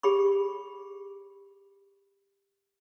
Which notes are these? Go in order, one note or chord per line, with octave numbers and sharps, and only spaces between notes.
G4 G#4 B5 C#6